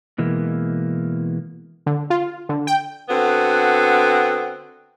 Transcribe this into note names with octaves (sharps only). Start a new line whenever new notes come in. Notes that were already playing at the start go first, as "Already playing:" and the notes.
B2 E3 G#3 A#3
D3
F4
D3
G5
D3 B3 C4 F#4